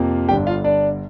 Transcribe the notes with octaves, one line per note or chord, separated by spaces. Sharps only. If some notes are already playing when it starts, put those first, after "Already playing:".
Already playing: F2 C3 F3 A#3
G1 G2 D3 G3 D4 G4 G5
F4 F5
D4 D5